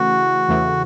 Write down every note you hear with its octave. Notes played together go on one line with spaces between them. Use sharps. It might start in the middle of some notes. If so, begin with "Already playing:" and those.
Already playing: C#3 E3 A3 F#4
E2 C#3 E3 A3